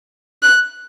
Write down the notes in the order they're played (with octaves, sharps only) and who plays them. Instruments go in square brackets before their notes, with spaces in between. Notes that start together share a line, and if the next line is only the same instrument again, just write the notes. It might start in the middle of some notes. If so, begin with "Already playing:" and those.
[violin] F#6